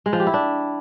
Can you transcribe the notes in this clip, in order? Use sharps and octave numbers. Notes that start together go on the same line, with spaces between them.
G#3
F3
G4
E4
D4